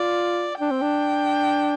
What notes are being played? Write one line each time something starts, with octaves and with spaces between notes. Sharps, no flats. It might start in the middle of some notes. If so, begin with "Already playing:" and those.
Already playing: F4 D5
D4 G5
C4
D4